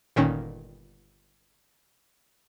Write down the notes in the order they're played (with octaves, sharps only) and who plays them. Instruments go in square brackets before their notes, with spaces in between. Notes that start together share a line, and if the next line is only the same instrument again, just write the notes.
[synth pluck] G1 A#2 D#3 C#4